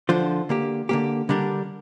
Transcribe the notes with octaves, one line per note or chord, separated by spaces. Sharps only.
D3 F3 D4 F4 C5
D3 A#3 G4
D3 A#3 G4
D3 G3 D4 G4 A#4